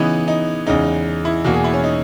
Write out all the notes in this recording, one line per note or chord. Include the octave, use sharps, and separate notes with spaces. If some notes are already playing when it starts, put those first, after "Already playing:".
Already playing: C#3 E3 B3 D#4
D#4
E2 C#3 G#3 D#4
E4
E2 B2 A#3 F#4
G#4
E4
C#4
D#4